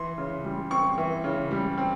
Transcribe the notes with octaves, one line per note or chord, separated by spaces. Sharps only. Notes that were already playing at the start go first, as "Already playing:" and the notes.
Already playing: E3 C6
C#3
G3
C4 C#6
E3
C#3
G3
C4